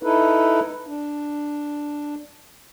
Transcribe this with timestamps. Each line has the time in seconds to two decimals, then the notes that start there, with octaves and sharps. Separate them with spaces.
0.03 D#4 E4 A4 B4
0.87 D4